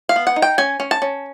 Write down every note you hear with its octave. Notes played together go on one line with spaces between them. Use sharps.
F5
B3
F#5
D#4
G5
C#4 G#5
C#4
A5
C#4